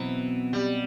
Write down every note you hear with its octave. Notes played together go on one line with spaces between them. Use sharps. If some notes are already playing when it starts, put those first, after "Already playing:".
Already playing: B2 E3 F#3 C4
G3